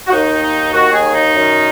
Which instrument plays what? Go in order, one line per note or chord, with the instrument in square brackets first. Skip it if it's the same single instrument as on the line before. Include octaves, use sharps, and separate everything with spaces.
[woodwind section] F#4
D#2 D#3 D#4
D#4
D#2 D#3 F#4
G#4
D#4
F#2 D#3